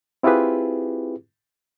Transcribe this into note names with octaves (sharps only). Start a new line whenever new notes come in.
C4 E4 F4 G4 G#4 B4